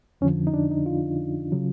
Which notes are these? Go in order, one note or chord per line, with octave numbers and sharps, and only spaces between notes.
F2 D3 F3 C#4
D#4
D4
D#4
F4
C#3 F#3